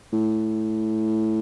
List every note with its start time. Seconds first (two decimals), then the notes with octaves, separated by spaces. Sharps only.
0.13 A2